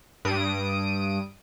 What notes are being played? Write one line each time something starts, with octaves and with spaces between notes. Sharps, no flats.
G2 D#6 D7